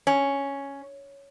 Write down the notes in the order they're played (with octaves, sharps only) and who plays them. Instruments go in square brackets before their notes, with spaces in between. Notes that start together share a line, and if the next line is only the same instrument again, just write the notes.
[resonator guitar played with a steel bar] C#4